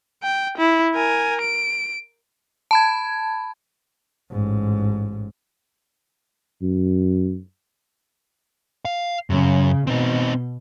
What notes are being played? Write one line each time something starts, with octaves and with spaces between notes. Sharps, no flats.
G5
E4
A#4 G#5
D7
A5 B5 G#6
A1 G#2
F#2
F5
F#2 C#3
B2 C4 D#4